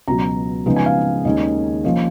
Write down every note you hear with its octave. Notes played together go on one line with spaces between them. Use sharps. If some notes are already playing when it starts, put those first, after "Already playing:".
C#2 B2 F#3 A#5
C#3 F3 G#3 B3 D#4
G#5
F5
D#2 D#3 G#3 C#4 D#5
F3 A#3 C#4 D#5